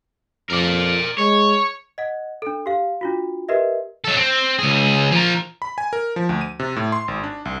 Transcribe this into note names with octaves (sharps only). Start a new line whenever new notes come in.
F2 A#4 D5
G#3 C#5
D#5 F#5
D4 A4
G4 F5
D4 F4 F#4
G4 A#4 B4 D#5 E5
F#3 A4
C4
C#2 G#4
F3 A#4
B5
G#5
A#4
F3
D2
D#7
C3
A2
C6
G#1
D4
C2